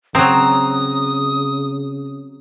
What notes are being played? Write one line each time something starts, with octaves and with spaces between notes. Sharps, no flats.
C#3 F#3 C4 A#5 D#6